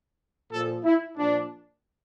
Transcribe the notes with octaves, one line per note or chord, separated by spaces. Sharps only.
A#2 F3 A4
E4
A#2 F3 D4